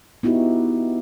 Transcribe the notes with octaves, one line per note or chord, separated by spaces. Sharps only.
B3 D#4 E4 F#4 G4